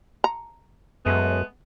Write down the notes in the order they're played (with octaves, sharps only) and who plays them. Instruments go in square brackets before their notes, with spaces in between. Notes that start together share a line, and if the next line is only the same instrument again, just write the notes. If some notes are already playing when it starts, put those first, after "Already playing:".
[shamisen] A#5
[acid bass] F#2 [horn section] G#3 A3 B3